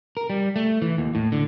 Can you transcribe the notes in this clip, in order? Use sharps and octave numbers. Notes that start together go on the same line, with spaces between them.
A#4
G3
A3
E3
D#2
A2
D3